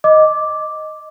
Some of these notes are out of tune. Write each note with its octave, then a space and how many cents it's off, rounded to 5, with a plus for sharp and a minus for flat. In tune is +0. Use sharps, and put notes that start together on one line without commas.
D#5 +0 D6 +0